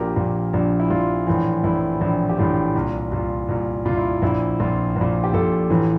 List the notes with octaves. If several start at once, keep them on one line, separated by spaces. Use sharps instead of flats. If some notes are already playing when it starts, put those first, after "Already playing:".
Already playing: A#1 A#2 G4 A#4
A#1 A#2
A#1 A#2
E4
A#1 A#2 F4
A#1 A2 E3
A#1 A2 E3 E4
A#1 A2 E3
G4
A#1 A2 E3 F4
C2 A#2
C2 A#2 F4
C2 A#2
C2 A#2 F4
E4
A#1 A#2 E4
A#1 A#2 F4
A#1 A#2
G4
A#1 A#2 F4 A4
A1 A2 E3